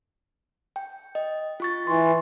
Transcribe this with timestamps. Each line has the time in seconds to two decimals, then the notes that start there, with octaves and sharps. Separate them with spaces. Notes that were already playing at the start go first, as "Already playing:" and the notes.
0.76 G5
1.15 D#5
1.60 F4 C#6 A6
1.87 E3 C6 C#6